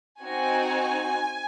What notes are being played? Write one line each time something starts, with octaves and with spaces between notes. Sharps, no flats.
C4 D#4 F#4 G#5